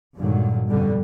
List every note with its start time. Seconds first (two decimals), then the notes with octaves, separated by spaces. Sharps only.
0.17 G2 A#2 D3 D#3 F#3 G#3
0.67 F2 B2 D3 G3